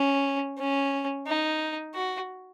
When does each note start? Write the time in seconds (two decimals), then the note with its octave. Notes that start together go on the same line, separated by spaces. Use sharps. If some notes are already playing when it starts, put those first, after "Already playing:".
Already playing: C#4
0.58 C#4
1.27 D#4
1.94 F#4